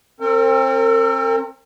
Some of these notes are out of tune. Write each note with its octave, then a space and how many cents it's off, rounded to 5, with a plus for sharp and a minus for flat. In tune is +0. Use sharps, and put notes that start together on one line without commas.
C4 +30 A#4 -40